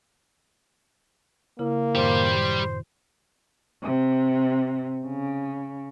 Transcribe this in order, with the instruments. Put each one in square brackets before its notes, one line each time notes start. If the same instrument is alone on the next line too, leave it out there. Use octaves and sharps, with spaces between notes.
[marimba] C#3 E4 [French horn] A#3
[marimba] F#2 A2 D#3 [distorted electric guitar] G3 G4 [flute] C5
[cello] C3
C#3